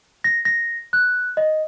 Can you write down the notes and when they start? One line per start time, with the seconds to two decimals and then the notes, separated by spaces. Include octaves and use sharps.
0.24 A#6
0.45 A#6
0.93 F#6
1.37 D#5